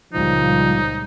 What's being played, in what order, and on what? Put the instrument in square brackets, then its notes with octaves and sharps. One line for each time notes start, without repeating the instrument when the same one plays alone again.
[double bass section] C#2 A#2 G3 [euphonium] F3 [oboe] D#4